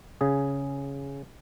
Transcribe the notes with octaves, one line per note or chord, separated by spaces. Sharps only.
C#3 G#4